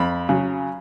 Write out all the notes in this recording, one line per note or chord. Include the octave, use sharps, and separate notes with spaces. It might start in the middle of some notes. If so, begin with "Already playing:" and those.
Already playing: F2 B5
C#3 F#3